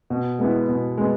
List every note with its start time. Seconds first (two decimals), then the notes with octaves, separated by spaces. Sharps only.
0.10 B2
0.39 G#3 B3 E4
0.69 B2
0.98 G#3 B3